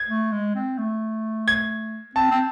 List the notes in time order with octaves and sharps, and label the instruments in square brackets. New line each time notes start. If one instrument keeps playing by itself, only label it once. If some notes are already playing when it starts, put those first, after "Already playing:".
Already playing: [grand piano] G#6
[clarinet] A3
G#3
C4
A3
[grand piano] G#6
[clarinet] C4 [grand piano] A5
[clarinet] C4